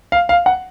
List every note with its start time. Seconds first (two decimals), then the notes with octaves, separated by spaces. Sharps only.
0.12 F5
0.29 F5
0.46 F#5